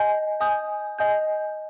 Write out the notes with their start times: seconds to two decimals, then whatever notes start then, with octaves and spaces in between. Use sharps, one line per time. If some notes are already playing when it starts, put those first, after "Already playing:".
Already playing: D#5 G#5 G6
0.40 D#5 G#5 D#6 G6
0.99 D#5 G#5 D#6 G6